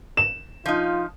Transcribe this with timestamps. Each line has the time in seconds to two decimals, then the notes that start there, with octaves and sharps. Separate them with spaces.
0.17 E7
0.66 F3 D#4 F4